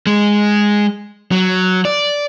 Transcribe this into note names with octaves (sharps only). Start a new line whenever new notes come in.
G#3
F#3
D5